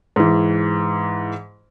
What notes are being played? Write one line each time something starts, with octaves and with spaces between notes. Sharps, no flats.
G#2 E3